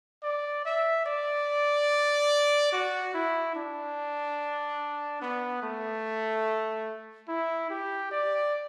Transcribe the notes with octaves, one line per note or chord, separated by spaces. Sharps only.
D5
E5
D5
F#4
E4
D4
B3
A3
E4
G4
D5